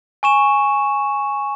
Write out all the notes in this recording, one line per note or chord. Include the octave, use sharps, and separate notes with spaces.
G#5 C#6 E7